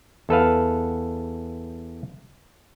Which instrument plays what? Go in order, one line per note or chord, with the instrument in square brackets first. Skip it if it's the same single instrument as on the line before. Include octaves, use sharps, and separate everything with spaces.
[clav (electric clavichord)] E2 A4 B4 F5